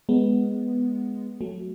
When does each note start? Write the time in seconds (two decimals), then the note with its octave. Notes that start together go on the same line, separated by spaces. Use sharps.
0.09 G#3 B3
1.41 F#3 A3